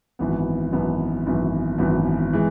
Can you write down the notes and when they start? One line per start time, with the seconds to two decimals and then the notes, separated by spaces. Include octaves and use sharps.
0.19 G#1 F#2 E3 B3
0.72 G#1 F#2 E3 B3
1.26 G#1 F#2 E3 B3
1.78 G#1 F#2 E3 B3
2.33 E3 G#3